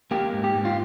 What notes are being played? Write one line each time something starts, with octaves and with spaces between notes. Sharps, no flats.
A#3 G4
G#2
G4
G#2
F4